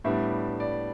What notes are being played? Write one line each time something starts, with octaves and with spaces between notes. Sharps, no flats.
A2 G3 B3 D4 E5
D5